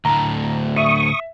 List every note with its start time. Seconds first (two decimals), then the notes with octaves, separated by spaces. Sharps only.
0.05 D2 A2 A#5
0.76 E5 C#6 D#6